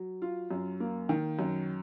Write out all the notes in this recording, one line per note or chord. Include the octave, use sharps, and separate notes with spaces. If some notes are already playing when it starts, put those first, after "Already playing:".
Already playing: F#3
F4
F#2
A#3
D#3
F#2